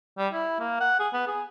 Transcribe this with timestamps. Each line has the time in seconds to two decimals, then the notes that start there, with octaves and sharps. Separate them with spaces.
0.18 G3
0.33 E4
0.60 A#3
0.81 F#5
1.00 G#4
1.14 B3
1.27 G#4